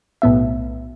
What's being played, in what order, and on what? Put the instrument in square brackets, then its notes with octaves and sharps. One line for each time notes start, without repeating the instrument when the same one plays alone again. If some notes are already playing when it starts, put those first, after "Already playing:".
[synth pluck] B1 A2 B3 E5